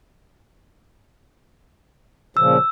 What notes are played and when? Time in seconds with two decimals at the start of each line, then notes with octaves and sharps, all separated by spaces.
2.37 A#2 C#3 F3 E6